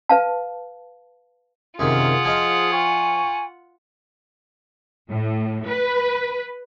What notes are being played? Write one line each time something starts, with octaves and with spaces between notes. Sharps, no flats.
B4 F5 A5
F#2 C3 D#3 F4 G#4 F#5
F3 G#4 D#5
G#5 C#6
A2
B4